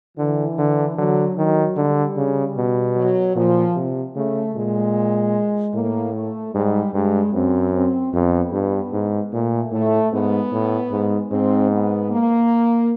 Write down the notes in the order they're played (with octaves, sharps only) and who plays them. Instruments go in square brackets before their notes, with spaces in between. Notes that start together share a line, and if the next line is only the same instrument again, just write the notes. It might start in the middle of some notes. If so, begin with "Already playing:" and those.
[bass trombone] D3 [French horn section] E3
[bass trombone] D3
[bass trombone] D3 [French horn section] F#3
[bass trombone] D#3 [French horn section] F#3
[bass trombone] D3 [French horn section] G3
[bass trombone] C#3
B2
[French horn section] F#3
[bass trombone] A#2 [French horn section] F3
[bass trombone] C3
[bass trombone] C#3 [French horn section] A3
[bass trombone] A#2 [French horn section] G#3
[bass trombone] A2 [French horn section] A#3
[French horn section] A3
[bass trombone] G#2 [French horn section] G3
[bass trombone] G2 [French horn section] G#3
[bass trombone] F#2 [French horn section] C4
[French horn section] C4
[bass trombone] F2 [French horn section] B3
[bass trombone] G2
G#2
[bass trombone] A#2 [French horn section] A3
[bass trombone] A2 [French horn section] A3
[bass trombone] G#2 [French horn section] B3
[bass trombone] A2
G#2
[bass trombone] G#2 [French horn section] C4
[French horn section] B3
A#3